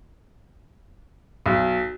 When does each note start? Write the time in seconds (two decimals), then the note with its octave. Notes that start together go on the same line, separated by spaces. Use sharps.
1.46 B1